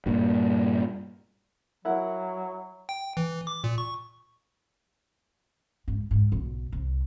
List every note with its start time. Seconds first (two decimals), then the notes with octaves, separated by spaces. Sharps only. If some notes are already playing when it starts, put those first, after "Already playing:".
0.06 G2 A#2
1.85 F#3 E4 A#4 F#5
2.89 G5
3.17 E3
3.47 D6
3.64 A#2
3.78 C#6
5.88 G#2
6.11 G#2
6.32 B1
6.72 C2